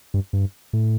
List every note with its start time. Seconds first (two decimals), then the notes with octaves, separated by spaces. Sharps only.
0.14 G2
0.33 G2
0.73 A2